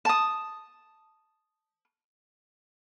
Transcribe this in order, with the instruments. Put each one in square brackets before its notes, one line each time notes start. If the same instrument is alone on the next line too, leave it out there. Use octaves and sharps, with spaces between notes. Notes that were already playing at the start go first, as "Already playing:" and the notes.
[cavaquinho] A5 D#6